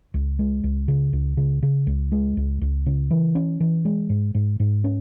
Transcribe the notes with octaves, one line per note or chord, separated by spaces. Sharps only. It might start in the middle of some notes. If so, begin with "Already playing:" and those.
C#2
G#3
C#2
C#3
C#2
C#3
C#3
C#2
G#3
C#2
C#2
C#3
E3
C#4
E3
G#3
G#2
G#2
G#2
C#4